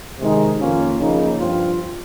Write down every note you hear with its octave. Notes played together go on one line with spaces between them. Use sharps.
C3 D#3 G#3 D#4
F2 D#3 A#3 C#4 F4
C#3 F3 A#3 D#4
G2 F3 C4 F4